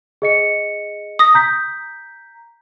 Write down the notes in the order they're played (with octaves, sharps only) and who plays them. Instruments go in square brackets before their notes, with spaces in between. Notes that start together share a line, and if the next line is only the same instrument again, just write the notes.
[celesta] G#4 D#5 C#7
[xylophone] D#6 A#6
[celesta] A#5 G6 B6